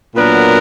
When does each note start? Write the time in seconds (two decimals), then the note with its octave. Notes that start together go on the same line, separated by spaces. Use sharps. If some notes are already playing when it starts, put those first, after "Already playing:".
0.16 A#2 F#3 B3 D4 A#4